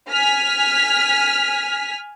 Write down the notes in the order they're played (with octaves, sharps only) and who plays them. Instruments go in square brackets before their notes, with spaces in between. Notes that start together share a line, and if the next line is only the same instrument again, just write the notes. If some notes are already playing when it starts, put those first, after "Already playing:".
[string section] G#5 F6 B6